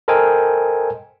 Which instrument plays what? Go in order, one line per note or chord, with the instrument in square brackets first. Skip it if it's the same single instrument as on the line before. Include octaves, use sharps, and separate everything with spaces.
[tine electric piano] A4 A#4 C5 D#5 G5 G#5